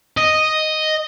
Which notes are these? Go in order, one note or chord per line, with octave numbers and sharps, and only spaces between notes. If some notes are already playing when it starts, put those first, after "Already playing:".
D#5